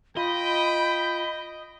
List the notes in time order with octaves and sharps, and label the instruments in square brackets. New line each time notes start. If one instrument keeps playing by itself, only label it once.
[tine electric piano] F4 [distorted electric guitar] D#5 [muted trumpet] G5 [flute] B5